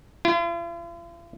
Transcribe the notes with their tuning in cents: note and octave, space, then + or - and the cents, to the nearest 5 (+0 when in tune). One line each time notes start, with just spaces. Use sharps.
F4 -45